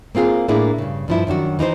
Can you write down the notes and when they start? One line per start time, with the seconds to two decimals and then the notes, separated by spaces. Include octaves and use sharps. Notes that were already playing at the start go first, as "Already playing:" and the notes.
0.15 A#3 C4 F4 G#4
0.48 A2 A#3 D4 E4 G#4
0.78 G2 C#3
1.08 G2 F3 E4
1.27 F#2 D#3 D4 F#4
1.59 E3 D#4 E4 C5